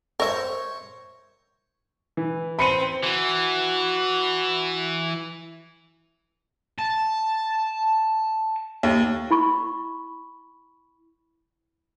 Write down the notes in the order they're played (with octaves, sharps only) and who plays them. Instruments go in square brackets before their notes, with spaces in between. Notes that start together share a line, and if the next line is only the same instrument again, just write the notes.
[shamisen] A#4 E5 [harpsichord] C5 C#5
[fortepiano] E3
[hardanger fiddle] C4 [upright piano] B5 C#7 D#7
[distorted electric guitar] E3 [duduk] F#4
[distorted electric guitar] A5
[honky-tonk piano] D#2
[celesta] E4 B5 C#6